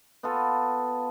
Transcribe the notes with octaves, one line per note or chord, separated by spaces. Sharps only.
B3 F4 A4